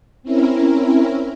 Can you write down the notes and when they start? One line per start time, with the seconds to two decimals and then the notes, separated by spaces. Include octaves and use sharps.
0.23 C4 C#4 E4 A#4